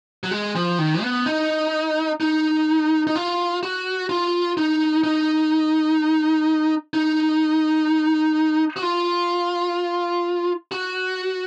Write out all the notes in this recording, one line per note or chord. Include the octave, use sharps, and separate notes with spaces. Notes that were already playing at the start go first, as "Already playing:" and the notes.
F#3
G#3
F3
D#3
B3
D#4
D#4
D#4
F4
F#4
F4
D#4
D#4
D#4
F#4
F4
F#4